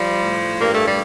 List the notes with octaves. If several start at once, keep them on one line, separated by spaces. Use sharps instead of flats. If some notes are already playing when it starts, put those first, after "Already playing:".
Already playing: F3 G3
A2
G2 A#3
A3
G3